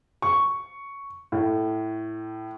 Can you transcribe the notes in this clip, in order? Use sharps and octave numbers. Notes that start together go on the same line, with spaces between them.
C#6
A2